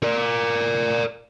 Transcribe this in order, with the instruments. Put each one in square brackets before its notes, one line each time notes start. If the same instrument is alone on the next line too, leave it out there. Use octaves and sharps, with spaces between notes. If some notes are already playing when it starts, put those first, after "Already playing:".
[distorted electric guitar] A#4 D5